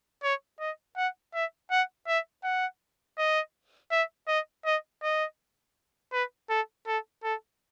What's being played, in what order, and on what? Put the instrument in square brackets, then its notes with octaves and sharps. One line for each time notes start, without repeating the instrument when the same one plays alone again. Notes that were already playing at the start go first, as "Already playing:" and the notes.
[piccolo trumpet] C#5
D#5
F#5
E5
F#5
E5
F#5
D#5
E5
D#5
D#5
D#5
B4
A4
A4
A4